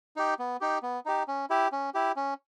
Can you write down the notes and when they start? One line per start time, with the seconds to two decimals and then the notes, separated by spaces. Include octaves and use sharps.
0.16 D#4 G4
0.39 B3
0.61 D#4 G4
0.82 B3
1.06 D#4 G4
1.28 C#4
1.50 E4 G4
1.72 C#4
1.94 E4 G4
2.16 C#4